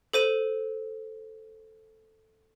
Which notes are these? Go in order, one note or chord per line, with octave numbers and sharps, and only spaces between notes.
A4 C5 D#7